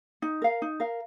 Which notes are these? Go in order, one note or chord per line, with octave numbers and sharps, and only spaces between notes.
D#4
A#4 F5
D#4
A#4 F5